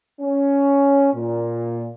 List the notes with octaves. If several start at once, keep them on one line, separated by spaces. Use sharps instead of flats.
C#4
A#2